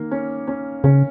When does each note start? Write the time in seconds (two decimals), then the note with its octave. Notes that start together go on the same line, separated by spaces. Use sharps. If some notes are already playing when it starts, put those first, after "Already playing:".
Already playing: D#3 A#3
0.11 C#4
0.47 C#4
0.84 C#3 C#4